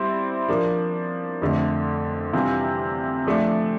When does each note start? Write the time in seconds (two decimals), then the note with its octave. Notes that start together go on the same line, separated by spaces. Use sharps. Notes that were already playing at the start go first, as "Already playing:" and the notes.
Already playing: G3 C4 E4
0.48 F3 A#3 D4
1.42 F2 D3 A3 C4
2.33 C3 E3 G3 D4 F4
3.27 F3 A3 D4